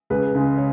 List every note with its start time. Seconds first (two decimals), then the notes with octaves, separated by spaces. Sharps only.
0.10 C#2 G#4 B4
0.35 C#3 G#3
0.58 C#5